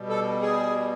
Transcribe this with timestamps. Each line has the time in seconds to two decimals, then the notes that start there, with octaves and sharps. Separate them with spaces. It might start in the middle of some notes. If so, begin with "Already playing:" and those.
Already playing: B2 G3
0.09 A4
0.41 G#4